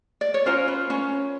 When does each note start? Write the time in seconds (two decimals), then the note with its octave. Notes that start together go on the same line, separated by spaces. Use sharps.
0.21 D5
0.34 C#5
0.46 C#4 F4 A#4 C5
0.68 B4
0.90 C#4 C#5